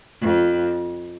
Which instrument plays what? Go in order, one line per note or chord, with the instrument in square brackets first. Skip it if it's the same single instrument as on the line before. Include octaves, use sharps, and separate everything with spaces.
[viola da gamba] F2